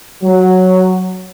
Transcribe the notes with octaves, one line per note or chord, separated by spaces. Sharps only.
F#3